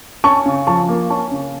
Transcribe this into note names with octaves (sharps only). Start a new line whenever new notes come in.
C#4 A5 C#6
C#3
F3 A5 C#6
A#3
C#4 A5 C#6
C#3